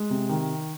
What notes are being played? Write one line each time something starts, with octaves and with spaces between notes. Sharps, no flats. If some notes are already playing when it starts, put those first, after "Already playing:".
Already playing: G#3
C3
D#3